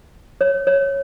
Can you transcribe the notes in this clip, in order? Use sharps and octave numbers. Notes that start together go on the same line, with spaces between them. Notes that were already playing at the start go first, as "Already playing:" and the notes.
C#5
C#5